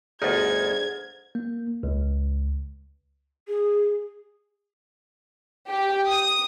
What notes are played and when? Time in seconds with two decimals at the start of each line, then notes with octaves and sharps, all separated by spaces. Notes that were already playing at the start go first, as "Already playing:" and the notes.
0.22 G1 D2 D#4 G#4 C5 G#6
1.35 A#3
1.83 C#2
3.48 G#4
5.68 G4
6.07 D#6